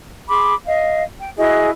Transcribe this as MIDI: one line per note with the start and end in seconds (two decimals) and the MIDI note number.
0.28 0.54 68
0.28 0.54 83
0.28 0.54 84
0.28 0.54 86
0.66 1.03 75
0.66 1.03 77
1.19 1.30 79
1.37 1.70 64
1.37 1.70 66
1.37 1.70 68
1.37 1.70 75